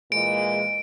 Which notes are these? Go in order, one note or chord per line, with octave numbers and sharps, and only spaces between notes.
A#2 E3 G#3 D7